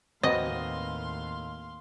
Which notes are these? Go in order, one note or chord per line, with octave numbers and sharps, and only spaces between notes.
D#2 A2 C4 F#4 B4 D#5 F5 C6